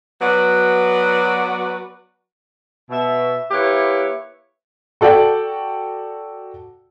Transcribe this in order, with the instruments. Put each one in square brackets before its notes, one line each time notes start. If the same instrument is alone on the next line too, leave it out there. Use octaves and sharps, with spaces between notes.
[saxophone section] F#3 B3 F#4 B4 D5
[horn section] B2 E5
A#3 E4 G4 B4 C#5 E5
[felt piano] F#4 A4 D5 F#5 G5